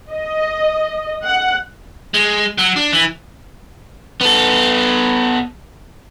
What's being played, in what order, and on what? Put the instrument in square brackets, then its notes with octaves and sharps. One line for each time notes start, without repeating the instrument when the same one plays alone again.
[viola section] D#5
F#5
[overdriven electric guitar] G#3
F#3
D4
E3
B3 A4